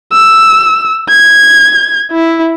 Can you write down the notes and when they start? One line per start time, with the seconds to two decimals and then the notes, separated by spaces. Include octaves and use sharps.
0.12 E6
1.09 G#6
2.12 E4